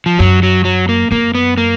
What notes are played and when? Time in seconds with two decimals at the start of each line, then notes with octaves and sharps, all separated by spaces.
0.06 F3
0.19 F#2 F#3
0.43 F#3
0.65 F#3
0.89 A#3
1.11 F#2 A#3
1.35 B3
1.58 A#3